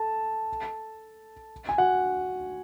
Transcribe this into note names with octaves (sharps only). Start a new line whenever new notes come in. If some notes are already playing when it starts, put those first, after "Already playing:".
Already playing: A4 A5
G#5
F#4 F#5